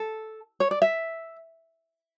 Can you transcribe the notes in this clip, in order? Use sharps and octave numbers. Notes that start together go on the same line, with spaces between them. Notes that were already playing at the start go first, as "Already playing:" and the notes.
Already playing: A4
C#5
D5
E5